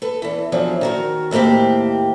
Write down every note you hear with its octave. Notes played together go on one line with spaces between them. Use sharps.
A4 B4
E2 E3
E2 F3 F#3 D4
D#3 F#4 A#4
D#2 A2 A#3 C4 G4